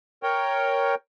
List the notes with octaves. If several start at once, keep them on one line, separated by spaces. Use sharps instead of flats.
A#4 C#5 G5